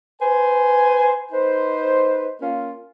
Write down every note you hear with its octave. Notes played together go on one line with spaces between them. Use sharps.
B4 C5 G#5
D#4 B4 C5
A#3 C#4 F4